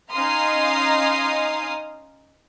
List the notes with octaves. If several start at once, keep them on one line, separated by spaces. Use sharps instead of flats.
C#4 D#4 F5 A#5 C6 D#6